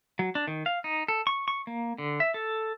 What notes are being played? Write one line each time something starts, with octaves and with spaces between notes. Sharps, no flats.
F#3
D4
D#3
F5
D#4
A4
C#6
C#6
A#3
D3
E5
A4